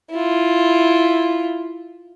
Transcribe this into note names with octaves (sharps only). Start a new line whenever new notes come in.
E4 F4